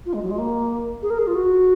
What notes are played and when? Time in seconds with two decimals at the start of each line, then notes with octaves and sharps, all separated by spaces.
0.06 F4
0.14 G#3
0.23 F#3
0.31 G#3
0.38 A#3
1.03 G#4
1.10 A#4
1.19 G#4
1.27 F4
1.35 F#4